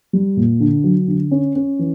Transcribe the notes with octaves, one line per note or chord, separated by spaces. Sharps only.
G3
A#2
D3
F#3
D3
C#4
C#4
E3